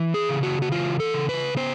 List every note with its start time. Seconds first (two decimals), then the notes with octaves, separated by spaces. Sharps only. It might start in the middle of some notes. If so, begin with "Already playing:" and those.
Already playing: E3
0.14 G#4
0.29 C#3
0.43 F#4
0.62 F#4
0.72 E3 F4
1.00 A4
1.14 C#3
1.29 B4
1.57 B3 C5